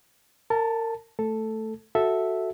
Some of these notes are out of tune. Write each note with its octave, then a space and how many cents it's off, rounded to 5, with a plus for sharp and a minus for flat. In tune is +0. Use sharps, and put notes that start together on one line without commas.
A#4 -30 A5 +0
A3 +0 A4 +0
F#4 +0 A4 +0 E5 -5